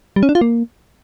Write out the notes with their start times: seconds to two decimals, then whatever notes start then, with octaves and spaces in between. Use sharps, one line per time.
0.16 G3
0.23 C#4
0.29 D4
0.35 F4
0.41 A#3